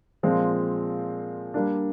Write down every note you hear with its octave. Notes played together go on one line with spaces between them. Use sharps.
A#2 F3 G#3 C4
G3 A#3 D4